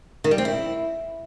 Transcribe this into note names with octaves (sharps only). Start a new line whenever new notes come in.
D#3
G3
C4
E4